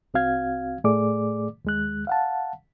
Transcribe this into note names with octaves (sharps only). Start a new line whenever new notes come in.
C2 C4 F#4 F5 G#6
A2 A3 G#4 D5 D6
D#2 G#3 F#6
F5 F#5 A5